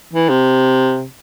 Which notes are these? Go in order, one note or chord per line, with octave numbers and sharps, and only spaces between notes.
E3
C3